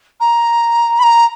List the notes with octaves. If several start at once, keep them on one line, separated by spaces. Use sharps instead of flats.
A#5
B5
A#5